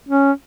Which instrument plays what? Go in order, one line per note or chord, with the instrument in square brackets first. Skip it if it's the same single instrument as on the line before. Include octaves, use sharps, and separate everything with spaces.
[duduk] C#4